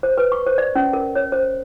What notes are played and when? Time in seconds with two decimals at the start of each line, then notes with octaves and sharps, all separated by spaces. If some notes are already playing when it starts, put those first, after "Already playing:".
0.03 C5
0.18 B4
0.32 C#6
0.46 C5
0.58 D5
0.75 C#4
0.93 A#4
1.15 C#5
1.32 C5